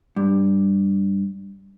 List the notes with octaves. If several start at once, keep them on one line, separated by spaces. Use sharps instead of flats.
G2